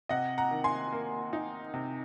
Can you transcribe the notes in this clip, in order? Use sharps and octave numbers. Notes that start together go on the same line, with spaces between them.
C3 D#5 F#5
F#5 A#5
D#3
G#5 C6
A#3
D#4
C3